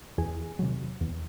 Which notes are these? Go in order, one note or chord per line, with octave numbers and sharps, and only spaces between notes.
E2 G#4
C3 D#3 F#3
E2